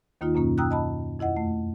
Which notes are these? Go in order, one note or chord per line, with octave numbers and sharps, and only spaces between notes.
D#2 D#3 A#3 D#4 F4
F#2 B2 A#3 C#4
G5 A#5 D#6 E6 F#6
D#5 A5 B5
F2 E4 D#5 F#5
A3